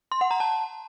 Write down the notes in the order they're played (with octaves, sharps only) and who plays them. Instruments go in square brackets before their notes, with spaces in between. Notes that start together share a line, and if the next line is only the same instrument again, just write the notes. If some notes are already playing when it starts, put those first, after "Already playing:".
[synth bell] C6
F#5
A#5
A5